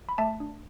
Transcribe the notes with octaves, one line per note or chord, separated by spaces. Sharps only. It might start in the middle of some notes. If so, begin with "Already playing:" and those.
B5
A3 E5 A5
D4